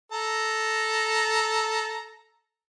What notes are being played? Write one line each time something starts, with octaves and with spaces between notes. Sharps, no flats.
A4 A#5